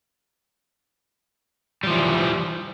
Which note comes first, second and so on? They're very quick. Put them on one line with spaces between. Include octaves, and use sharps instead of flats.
G3 F3 E3